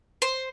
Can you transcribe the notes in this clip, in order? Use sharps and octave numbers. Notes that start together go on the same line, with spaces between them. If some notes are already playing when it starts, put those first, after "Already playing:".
C5